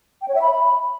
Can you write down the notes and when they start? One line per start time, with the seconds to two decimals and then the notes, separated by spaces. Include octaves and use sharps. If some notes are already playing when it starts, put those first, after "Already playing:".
0.22 G5
0.28 C#5
0.35 E5
0.42 B5